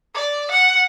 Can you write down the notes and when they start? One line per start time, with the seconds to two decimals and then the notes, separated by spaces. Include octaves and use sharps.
0.15 D5
0.51 F#5